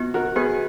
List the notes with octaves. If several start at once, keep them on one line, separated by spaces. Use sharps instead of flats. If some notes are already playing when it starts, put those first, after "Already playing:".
Already playing: B3 F4 F#4
F#4 A#4
B3 G#4 B4